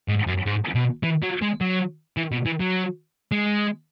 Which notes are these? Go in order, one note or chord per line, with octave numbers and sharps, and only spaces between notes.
G#2
F#2
G#2
B2
E3
F#3
G#3
F#3
E3
B2
E3
F#3
G#3